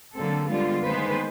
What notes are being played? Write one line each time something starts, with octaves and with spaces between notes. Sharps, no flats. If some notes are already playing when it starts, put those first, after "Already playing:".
D3 F#3 A#3 C4 A4
D3 G3 G#3 B3 F4
D#3 G#3 A#3 B3 B4 C5